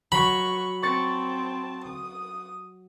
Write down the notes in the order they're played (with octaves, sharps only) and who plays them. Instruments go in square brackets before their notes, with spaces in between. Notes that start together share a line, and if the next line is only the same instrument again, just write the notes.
[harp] F#3 [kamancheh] F#4 C#6 [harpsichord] B5
[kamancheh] C4 A5 [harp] C#6 A6 C#7
[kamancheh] D#6